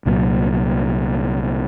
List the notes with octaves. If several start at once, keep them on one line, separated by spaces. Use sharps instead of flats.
C2 A#2 F#3